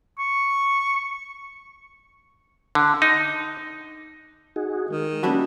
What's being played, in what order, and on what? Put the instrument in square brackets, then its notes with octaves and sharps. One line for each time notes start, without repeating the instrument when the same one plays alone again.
[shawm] C#6
[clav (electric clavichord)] D3
D#4
[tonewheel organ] D#4 F#4 G#4
[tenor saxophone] D#3 [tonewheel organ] G#3
[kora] G3 D4 E4 [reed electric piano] A#3 C#4 F#4